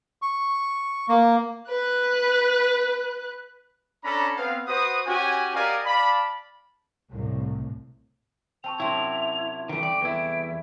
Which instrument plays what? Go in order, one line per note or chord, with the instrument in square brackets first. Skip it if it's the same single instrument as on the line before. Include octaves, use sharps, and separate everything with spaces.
[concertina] C#6
A#3
[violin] B4 F#6
[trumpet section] C#4 D4 A4 A#5 B5
B3 C4 F5
F#4 B4 C5 D#6
C#4 F#4 G4 G#5
G4 A#4 D5 D#5 F5 G#5
D5 F5 A5 B5
[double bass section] C2 A2
[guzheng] C4 [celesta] G5 A5 C#6 [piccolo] F7
[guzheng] F#2 C3 F#3 [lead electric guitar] E4 [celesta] A5 C6
[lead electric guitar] D#3 E3 [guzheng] G3 A3 [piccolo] D7
[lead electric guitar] D5
E2 E4